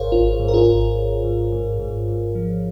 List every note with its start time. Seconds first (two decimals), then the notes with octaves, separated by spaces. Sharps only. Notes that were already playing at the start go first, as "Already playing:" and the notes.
Already playing: G#1 G#2 G#4 A#4 C5 C#5 F5
0.12 G#1 F4
0.40 G#2
0.48 A#4
0.54 F4 G#4
0.68 G#1
0.96 G#1
1.24 G#2
1.52 G#2
1.80 G#2
2.08 G#2
2.35 F3